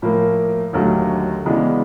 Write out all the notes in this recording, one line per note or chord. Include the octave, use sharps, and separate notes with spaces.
A2 F3 A#3
D#2 D3 F#3 A3
C#3 E3 G#3 B3 D4